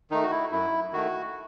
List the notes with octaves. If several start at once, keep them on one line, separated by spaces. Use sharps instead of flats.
D#3 A3 D#4
F#4
E4
F#2 E4
D#3 A3 F#4